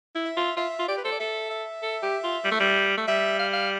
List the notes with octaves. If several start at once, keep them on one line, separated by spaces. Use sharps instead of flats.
E4
E5
F4
F4 E5
F4
G4 D5
B4
A4 C5
D5
A4 E5
E5
A4
G4
F4
G3
A3
G3
A3
G3 E5
F5
F5